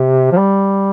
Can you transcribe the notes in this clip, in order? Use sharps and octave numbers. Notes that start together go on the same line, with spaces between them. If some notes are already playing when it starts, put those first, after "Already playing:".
Already playing: C3
F3
G3